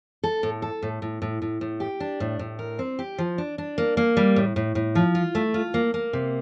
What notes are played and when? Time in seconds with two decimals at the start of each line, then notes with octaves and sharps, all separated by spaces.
0.24 A4
0.43 A2
0.62 A4
0.82 A2
1.02 A2
1.22 A2
1.42 A2
1.61 A2
1.80 G4
2.00 D4
2.20 A2
2.39 A2
2.59 A#4
2.79 C4
2.99 G4
3.18 F3
3.38 D4
3.58 D4
3.78 A#3
3.97 A#3
4.17 G3
4.36 A2
4.56 A2
4.75 A2
4.95 F3
5.15 F4
5.35 A3
5.54 F4
5.74 A#3
5.94 A#3
6.13 C3